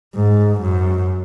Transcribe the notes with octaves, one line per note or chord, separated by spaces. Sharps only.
G#2
F#2